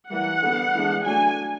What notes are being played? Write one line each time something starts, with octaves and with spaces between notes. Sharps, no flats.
E3 G3 A#3 F#5
D3 G3 B3
E3 G#3 B3 D4
F#3 A3 D4 G#5